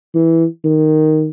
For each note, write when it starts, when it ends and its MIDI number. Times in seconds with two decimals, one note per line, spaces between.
0.14 0.45 52
0.64 1.30 51